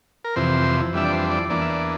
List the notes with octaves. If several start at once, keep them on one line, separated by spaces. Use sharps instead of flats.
A#4
F2 C3 E3 C5
F2 E3 G3 D4 E5
D5
C5
D5
E2 E3 A#3 D4 D5
E5
D5